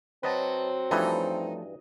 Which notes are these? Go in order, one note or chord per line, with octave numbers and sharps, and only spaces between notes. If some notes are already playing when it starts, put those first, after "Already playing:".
F#3 C4 B4 D#5 A5
G2 E3 F3 A3 D#4 A4